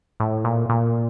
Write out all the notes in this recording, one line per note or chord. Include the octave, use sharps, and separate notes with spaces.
A2
A#2
A#2